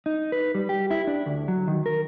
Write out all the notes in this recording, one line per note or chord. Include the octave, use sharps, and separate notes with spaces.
D#4
B4
G3
G4
E4
D4
D2
F#3
D#3
A#4